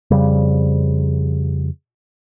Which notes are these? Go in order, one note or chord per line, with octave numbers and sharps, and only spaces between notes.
F2 C#3 G3